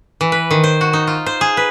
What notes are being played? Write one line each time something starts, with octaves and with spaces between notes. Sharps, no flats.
E3
B4
D#3
C5
F#4
D#4
F4
C5
G#4
B4